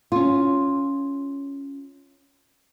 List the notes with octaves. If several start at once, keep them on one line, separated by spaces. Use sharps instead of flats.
C#4 F4